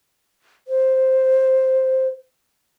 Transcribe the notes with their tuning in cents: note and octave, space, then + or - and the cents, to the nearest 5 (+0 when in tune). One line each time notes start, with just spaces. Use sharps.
C5 +0